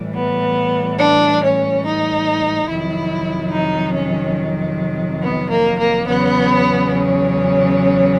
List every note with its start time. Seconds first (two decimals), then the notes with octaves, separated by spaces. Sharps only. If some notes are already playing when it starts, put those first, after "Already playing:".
Already playing: A2 E3 G3
0.14 B3
0.98 D4
1.41 C#4
1.83 D#4
2.68 F2 C3 D#3 F#3 E4
3.51 D#4
3.93 C#4
5.21 B3
5.48 A#3
5.77 A#3
6.05 E2 C#3 F#3 B3
6.89 C#4